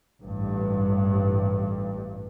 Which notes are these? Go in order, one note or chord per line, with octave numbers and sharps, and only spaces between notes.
A1 G2